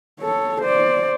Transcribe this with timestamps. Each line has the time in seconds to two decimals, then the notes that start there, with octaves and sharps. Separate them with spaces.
0.20 A4 C#5
0.61 C5 D5